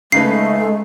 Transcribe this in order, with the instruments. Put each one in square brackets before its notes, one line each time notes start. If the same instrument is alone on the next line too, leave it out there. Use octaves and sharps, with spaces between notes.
[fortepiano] C#3 D#4 B4 [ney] G#3 [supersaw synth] A3 [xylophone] C7